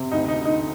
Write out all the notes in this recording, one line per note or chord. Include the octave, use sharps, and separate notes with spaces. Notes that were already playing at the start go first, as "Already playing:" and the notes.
Already playing: C3
D2 D#4
D#4
D3
D#4